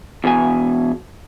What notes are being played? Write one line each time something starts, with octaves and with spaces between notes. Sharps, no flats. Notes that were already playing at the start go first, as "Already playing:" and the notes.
E2 B2 G#5